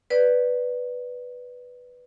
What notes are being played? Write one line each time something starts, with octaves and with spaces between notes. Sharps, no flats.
B4 D5